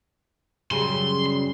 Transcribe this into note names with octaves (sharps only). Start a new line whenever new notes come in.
F#2 C#3 G3 C6